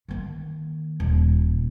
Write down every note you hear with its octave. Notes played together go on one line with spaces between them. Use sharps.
D#3 A#3
D#1